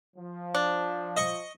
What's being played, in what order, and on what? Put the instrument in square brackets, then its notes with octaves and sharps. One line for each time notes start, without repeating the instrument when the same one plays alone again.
[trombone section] F3
[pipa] D4
[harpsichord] D#5 C#6